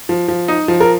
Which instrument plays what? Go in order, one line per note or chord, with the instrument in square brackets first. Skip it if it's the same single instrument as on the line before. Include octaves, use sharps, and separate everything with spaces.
[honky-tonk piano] F3
F3
D#4
F3
[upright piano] A#4